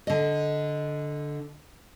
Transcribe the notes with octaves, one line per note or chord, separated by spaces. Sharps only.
D3 D#5